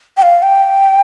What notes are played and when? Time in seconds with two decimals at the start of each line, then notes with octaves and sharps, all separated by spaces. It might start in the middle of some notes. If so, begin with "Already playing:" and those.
0.17 G5
0.22 F5
0.42 G5